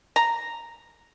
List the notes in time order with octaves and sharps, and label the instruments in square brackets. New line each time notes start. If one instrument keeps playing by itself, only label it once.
[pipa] A#5